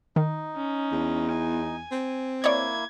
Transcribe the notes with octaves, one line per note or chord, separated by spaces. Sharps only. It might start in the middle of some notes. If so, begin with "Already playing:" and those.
D#3 D#4
C#4
E2
G#5
C4
A#3 E4 C#5 D5 G#6